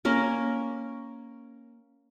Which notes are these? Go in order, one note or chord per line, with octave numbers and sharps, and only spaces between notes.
A#3 C#4 A#4